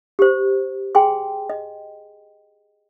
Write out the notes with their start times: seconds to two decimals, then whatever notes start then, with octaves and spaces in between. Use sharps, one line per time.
0.19 G4 C5
0.95 G#4 G5 G#5 C6
1.50 D#5